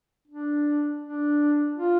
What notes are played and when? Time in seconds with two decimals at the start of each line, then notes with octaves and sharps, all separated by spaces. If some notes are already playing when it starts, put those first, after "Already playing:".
0.28 D4
1.02 D4
1.77 F4